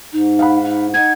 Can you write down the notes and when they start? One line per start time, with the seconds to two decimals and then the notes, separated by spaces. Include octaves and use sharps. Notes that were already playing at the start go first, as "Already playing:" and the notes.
0.13 G#2 D#4
0.39 F5 F#5 B5
0.64 D#4
0.94 D#4 F#5 G#6